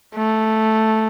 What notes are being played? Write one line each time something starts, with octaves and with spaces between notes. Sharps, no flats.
A3